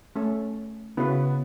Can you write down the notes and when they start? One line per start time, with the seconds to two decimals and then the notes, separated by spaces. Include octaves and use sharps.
0.16 A3 C#4 A4
0.97 C#3 B3 E4 F#4 B4